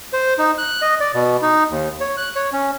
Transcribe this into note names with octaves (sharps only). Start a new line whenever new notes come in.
C5
D#4
F#6
D#5
D5
B2
D#4
D#2
C#5
F#6
C#5
C#4